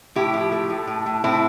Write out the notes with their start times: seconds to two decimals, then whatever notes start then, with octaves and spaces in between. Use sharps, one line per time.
0.15 A2 E4 G4
0.34 F3
0.52 A3
0.70 A2
0.87 A2
1.06 A2
1.24 A2 C4 E4